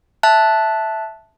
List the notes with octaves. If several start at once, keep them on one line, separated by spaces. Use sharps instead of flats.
E5 A5 F#6